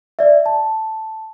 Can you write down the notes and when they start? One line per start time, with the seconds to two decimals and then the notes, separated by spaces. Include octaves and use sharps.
0.19 D5 E5
0.46 A5